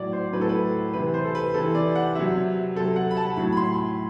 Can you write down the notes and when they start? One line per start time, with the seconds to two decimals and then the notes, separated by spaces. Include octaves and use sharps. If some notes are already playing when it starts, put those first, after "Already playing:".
Already playing: A2 F#3 D5
0.13 C5
0.33 A2 F#3 B4
0.41 A4
0.49 B4
0.93 C3 E3 B4
1.14 C5
1.25 A4
1.35 B4
1.54 C3 E3 A4
1.75 D5
1.95 F#5
2.15 C3 F#3 E5
2.76 C3 A4
2.80 F#3
2.96 F#5
3.11 B5
3.17 A5
3.36 A2 F#3 B5
3.52 B5
3.57 C6
3.77 B5